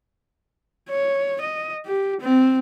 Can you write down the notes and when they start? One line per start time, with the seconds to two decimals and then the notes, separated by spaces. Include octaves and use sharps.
0.89 C#5
1.41 D#5
1.86 G4
2.21 C4